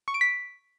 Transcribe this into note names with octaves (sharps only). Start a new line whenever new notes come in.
C#6
D7
B6